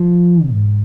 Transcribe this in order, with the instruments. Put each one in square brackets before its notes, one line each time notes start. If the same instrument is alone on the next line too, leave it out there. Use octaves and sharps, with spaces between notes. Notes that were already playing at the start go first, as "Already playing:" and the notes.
Already playing: [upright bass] F3
G#2